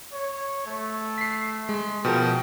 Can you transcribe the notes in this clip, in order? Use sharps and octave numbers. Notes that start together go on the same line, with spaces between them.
C#5
A3
B6 C7
G#3
B2 F3 A#4 G5